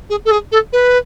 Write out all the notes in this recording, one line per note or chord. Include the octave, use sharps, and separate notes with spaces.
G#4
A4
G#4
A4
B4